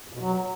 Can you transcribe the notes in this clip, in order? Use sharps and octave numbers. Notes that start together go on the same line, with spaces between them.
F2
B2
F#3